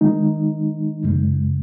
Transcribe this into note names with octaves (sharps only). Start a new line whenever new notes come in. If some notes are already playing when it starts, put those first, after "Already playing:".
D#3 G#3 D#4
F#2 C#3 G#3